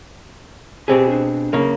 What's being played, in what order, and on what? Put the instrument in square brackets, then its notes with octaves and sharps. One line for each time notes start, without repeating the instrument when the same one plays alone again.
[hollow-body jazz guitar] B2 C4 G#4 [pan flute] G4
[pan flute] D4
[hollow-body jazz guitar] C#3 A#3